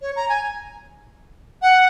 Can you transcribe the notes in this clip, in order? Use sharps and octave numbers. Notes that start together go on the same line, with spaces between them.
C#5
A#5
G#5
F#5